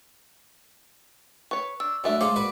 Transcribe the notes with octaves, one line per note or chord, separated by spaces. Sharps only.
B4 C#5 C#6
D4 E6
F#2 G#3 A3 D4 E5
C#3 G#3 F4 C5 C#5 F5 D6
A#3 F#4 B4 D5